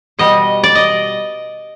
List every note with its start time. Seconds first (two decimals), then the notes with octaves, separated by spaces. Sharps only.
0.19 B2 G3 D#5
0.64 D5
0.75 D#5